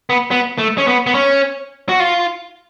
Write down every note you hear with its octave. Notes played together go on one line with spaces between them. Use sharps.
B3
B3
A3
C#4
B3
B3
C#4
F#4
F4